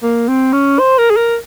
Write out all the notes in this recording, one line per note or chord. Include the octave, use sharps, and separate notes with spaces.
A#3
C4
C#4
C5
A#4
G#4
A#4